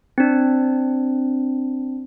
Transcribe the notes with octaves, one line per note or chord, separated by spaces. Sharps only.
C4 D4